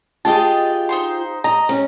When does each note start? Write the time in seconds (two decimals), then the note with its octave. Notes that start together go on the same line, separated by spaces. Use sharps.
0.25 F4 G4 G#4 D#5 A5
0.89 D#4 C5 C6
1.44 D#5 A#5
1.69 C#4